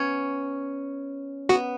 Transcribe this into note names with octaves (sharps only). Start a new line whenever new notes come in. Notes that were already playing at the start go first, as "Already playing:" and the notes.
Already playing: B3 C#4
B3 F#4